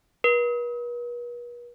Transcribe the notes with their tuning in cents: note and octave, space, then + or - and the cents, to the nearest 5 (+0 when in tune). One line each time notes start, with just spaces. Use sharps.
B4 -45